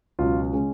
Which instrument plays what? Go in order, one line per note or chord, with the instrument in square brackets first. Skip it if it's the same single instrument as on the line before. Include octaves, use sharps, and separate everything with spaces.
[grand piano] C#2 B2 F#3 C#4 F4
C#3 G#3 C#4